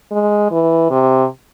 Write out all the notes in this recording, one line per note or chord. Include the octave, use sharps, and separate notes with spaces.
G#3
E3
C3